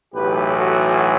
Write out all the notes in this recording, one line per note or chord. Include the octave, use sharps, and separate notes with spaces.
B1 A2 E3 G4 B4
F#4 A4